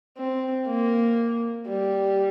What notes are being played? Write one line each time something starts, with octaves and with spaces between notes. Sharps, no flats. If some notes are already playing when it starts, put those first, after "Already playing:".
C4
A#3
G3